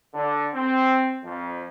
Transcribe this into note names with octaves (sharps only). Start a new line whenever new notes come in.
D3
C4
F2